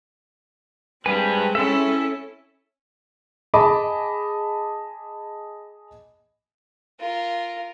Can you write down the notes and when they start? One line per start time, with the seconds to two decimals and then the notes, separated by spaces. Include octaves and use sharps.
1.06 G3 G#3 C4 B4 G#5 B5
1.55 C#4 E4 A4 E5
3.54 G#4 D#5 A5 B5 D6
7.00 F4 A#4